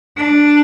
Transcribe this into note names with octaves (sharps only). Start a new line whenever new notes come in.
D4